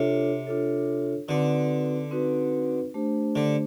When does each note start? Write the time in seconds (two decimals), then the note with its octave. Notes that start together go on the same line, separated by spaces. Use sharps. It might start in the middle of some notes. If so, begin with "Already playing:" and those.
Already playing: C3 D4 F4 A4 C#5
0.46 D4 F4 A4 C#5
1.28 D3 C4 D#4 F#4 B4
2.11 C4 D#4 F#4 B4
2.94 A3 D4 G4 C5
3.36 D3